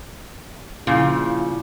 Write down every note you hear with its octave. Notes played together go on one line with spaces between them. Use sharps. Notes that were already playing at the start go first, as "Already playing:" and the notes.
A#2 C#3 F3 E4